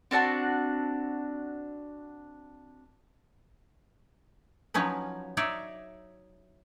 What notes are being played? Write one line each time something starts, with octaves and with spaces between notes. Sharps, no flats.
C4 D4 F#4 A5
F3 F#3 C#4 D#4 B4
D#4 C#5 D5 E5